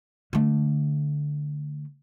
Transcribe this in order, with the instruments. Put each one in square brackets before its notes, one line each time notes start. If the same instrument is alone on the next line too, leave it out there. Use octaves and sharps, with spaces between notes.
[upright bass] D3 A3